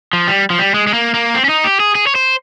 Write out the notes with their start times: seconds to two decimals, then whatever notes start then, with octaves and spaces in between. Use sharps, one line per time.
0.13 F3
0.28 G3
0.50 F3
0.59 G3
0.74 G#3
0.87 G#3
0.94 A#3
1.14 A#3
1.34 C4
1.45 C#4
1.49 D#4
1.64 G4
1.80 G#4
1.95 G#4
2.07 C#5
2.15 C5